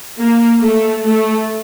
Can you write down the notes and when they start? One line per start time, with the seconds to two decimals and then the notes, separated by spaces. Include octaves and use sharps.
0.19 A#3
0.61 A3
1.03 A3